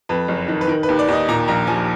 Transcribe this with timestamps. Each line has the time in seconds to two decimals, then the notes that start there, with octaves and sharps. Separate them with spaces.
0.09 F2 B4
0.28 F#1
0.48 D#3
0.61 B4
0.68 D#3 A#4
0.83 B4
0.89 D#2
0.99 D5
1.08 D#2 D#5
1.29 A#2 A#5
1.48 A#1 A#5
1.67 F3 G#5